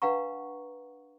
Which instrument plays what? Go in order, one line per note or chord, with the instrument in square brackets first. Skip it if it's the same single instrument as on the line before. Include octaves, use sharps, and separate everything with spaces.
[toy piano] D4 B4 F5 F#5 A#5 C#6